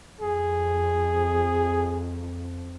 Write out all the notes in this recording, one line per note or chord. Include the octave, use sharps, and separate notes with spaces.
F2 G#4